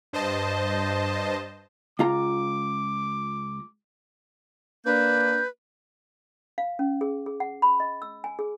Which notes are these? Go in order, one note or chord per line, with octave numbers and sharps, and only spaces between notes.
G2 C5 D#5 A5
C#2 F4 A#5 D6
A#3 D4 B4 G6
F5
C#4
G#4
G#4
F#5
B5
D#5
E6
G#5
G#4